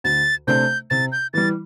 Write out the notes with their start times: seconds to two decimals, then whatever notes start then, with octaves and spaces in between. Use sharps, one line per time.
0.04 D2 A6
0.47 C3 A3 D4 C5 G6
0.90 C3 A6
1.12 G6
1.34 E3 G3 A6